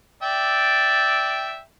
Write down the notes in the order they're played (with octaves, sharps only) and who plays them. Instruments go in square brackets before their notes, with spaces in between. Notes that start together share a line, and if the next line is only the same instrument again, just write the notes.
[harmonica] D5 E5 G5